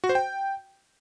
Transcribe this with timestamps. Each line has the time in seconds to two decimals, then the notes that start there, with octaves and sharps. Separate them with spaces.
0.04 F#4
0.09 C5
0.15 G5